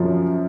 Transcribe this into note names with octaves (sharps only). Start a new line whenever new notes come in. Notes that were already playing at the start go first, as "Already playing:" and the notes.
Already playing: F#2 F3